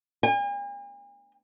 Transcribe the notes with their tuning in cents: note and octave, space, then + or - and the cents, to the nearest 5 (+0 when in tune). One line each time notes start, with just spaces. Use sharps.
G#5 -45